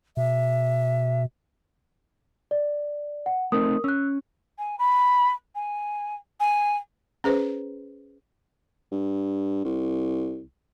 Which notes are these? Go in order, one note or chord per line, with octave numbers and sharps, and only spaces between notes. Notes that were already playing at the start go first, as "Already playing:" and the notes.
B2 E5
D5
F#5
A3 C4 D#4 A#4 D#6
C#4 E6 F#6
G#5
B5
G#5
G#5
C#4 G#4 B4 C5
G2
C2